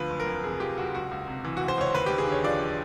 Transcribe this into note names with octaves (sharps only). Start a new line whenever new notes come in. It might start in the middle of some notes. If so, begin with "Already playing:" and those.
Already playing: D2 F3 B4
F#1
A#4
F2
C3 G#4
F3 G4
F#1 F#4
C#2 F#4
C#2
C3
E3
C#2 F#4
C5
C#2 C#5
D#2 B4
D#2 G4
G#4
D3
C#5
F3 D5